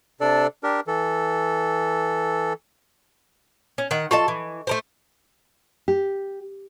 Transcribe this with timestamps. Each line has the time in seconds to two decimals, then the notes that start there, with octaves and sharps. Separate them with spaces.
0.21 C3 D4 A4 D5
0.63 D4 G4 A#4
0.87 E3 A4
3.78 C#4
3.91 D#3 F#5
4.11 F4 A4 D#5 A5 C#6
4.28 E3
4.67 A3 A#4 C5
5.88 G4